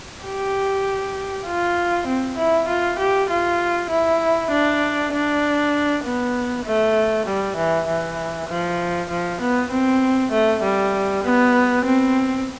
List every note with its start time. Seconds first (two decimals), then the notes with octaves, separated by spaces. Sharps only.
0.24 G4
1.46 F4
2.07 C4
2.38 E4
2.69 F4
2.99 G4
3.30 F4
3.91 E4
4.51 D4
5.13 D4
6.05 B3
6.65 A3
7.26 G3
7.57 E3
7.88 E3
8.49 F3
9.10 F3
9.41 B3
9.72 C4
10.32 A3
10.63 G3
11.24 B3
11.85 C4